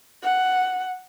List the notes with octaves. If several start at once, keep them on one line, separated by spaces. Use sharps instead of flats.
F#5